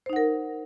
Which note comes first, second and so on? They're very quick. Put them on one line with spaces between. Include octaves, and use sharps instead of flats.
C5 D#4 F#5 A#4